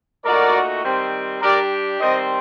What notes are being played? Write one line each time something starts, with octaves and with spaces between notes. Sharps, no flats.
A#2 A3 D#4 F#4 A#4 D5
D#3 G3 C4
G3 D4 G4 A#4 D5
D#3 G3 C4 C5 D#5